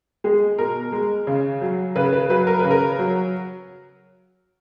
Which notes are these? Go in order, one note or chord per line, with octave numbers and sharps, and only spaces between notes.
G#3 G#4
B2 A#4
G#3
C#3
F#3
C#3 B4
B4
F#3 B4
A#4
C#3 B4
A#4
F#3